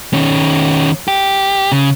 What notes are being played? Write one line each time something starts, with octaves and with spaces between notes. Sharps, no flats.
D#3 C#4
G4
C#3